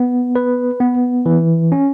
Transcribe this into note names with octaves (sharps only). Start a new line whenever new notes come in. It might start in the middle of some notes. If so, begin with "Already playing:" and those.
Already playing: B3
B4
B3
E3
C#4